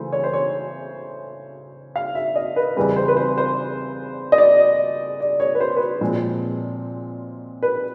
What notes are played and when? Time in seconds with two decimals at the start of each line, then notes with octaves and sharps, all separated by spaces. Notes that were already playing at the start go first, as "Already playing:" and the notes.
Already playing: C#3 E3 A3 C5
0.13 C#5
0.24 C5
0.34 C#5
1.96 F5
2.15 E5
2.35 D#5
2.56 B4
2.77 E2 C#3 E3 G3 C4 B4
2.96 C5
3.08 B4
3.17 C5
3.38 C5
4.32 D#5
4.38 D5
5.20 D5
5.40 C#5
5.55 B4
5.61 C5
5.76 B4
5.81 C5
6.01 A#2 F3 G#3 C4
7.63 B4